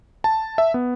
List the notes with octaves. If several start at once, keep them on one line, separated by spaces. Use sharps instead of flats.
A5
E5
B3